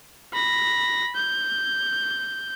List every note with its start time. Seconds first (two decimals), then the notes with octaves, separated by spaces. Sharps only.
0.33 B5 A#6
1.16 G6